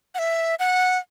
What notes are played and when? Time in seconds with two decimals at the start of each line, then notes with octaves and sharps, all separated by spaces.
0.15 F#5
0.19 E5
0.59 F#5